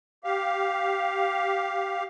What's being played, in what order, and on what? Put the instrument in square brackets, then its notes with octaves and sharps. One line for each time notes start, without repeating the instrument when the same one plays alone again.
[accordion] G4 F5